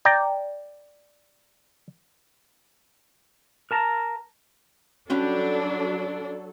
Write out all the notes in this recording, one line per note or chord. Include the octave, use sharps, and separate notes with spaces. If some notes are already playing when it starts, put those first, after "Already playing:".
D5 G5 A#5
A#4 A5 A#5
F#3 G3 C#4 D4 F#4 A4